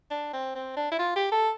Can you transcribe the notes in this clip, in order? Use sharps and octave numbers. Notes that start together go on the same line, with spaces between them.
D4
C4
C4
D4
E4
F4
G4
A4